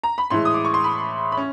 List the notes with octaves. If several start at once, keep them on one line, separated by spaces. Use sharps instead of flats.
A#5
B5
A2 E3 G#3 C6
D#6
D6
C#6
C6
B5
B5
C#4